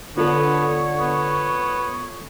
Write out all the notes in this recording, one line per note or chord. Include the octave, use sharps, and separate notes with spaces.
D3 B3 F4 A4 C#5
B3